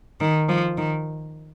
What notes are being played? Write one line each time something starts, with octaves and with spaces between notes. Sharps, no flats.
D#3
F3
D#3